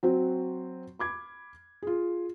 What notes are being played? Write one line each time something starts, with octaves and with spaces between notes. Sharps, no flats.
F#3 C4 F#4
B5 D6 G#6
F4 G#4